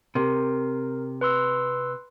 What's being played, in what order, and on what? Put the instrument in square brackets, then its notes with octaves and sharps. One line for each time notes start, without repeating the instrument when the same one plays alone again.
[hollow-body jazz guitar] C3 [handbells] A#4
[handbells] B4 C6 E6